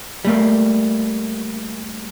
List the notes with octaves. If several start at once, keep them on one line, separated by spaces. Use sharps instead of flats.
G3 A3 A#3